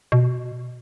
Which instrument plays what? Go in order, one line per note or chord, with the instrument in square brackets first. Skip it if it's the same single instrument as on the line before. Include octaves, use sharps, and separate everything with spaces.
[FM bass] B2